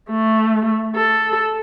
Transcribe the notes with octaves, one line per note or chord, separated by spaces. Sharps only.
A3
A4